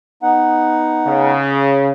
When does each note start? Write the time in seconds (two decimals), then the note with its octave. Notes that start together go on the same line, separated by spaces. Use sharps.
0.23 B3 D#4 F#5
1.06 C#3